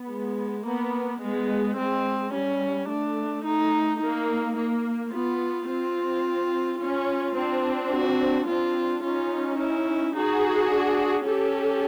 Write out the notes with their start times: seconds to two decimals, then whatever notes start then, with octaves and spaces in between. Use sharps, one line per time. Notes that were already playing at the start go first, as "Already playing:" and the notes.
Already playing: B3
0.10 G#3
0.65 A#3 B3
1.21 G#3 B3
1.77 G#3 C4
2.33 G3 C#4
2.89 A3 D4
3.45 D#4
4.01 A#3 D#4
4.56 A#3
5.12 B3 F4
5.69 C4 F4
6.80 C#4 F4
7.36 C4 D4
7.92 F#4
8.47 C4 D4 F4
9.03 C#4 D#4 F4
9.59 E4
10.15 D#4 F#4 G#4
10.72 D4
11.27 C#4 G4 A4